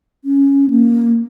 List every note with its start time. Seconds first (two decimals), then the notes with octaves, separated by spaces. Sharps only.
0.25 C#4
0.70 A#3